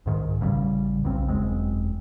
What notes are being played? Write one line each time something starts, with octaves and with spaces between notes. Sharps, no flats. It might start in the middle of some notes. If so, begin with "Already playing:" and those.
C2 G#2 D#3
A1 C#3 F#3 G3
B1 F#2 C#3 C4
E1 F#2 G#3 C4